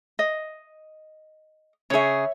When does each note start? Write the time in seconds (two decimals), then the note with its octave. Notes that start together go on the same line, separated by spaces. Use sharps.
0.19 D#5
1.90 C#3 G#4 C#5 E5